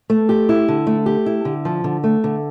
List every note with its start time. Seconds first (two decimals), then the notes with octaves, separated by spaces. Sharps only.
0.10 A3
0.29 G4
0.49 E4
0.68 D3
0.87 A3
1.06 G4
1.26 E4
1.45 D3
1.65 F3
1.84 D3
2.04 A3
2.24 D3